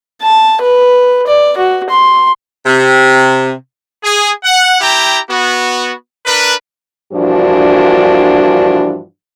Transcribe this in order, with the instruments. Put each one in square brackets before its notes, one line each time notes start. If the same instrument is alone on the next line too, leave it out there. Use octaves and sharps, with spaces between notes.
[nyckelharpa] A5
B4
D5
F#4
C6
[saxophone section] C3
[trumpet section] G#4
F#5
E4 G4 G5 A#5
B3 F#4
D4 A#4 B4
[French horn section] G2 A#2 E3 F3 D4 F#4